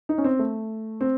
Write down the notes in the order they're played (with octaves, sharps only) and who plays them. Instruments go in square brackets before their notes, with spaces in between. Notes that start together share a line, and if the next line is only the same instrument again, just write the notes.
[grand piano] D#4
C#4
C4
A3
C4